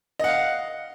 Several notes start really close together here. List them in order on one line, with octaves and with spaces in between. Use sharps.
D#5 F#5 F5